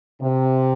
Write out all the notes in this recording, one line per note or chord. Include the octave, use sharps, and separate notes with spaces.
C3